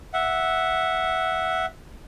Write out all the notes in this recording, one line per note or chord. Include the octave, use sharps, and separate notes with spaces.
E5 F#5